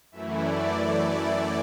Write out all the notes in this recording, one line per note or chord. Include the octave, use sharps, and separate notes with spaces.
F#2 E3 A3 E4 E5
D5